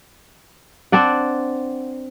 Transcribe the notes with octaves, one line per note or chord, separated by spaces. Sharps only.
C4 D4 D5 F#5